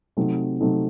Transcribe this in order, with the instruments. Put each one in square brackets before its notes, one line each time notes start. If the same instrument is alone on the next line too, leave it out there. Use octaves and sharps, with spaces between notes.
[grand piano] C3 F#3 A3 C4 D#4
C3 F#3 A3 C4 D#4